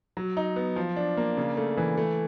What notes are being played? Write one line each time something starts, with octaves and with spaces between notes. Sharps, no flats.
F#3
D#4
B3
F3
D4
A#3
C#3
A3
E3
A3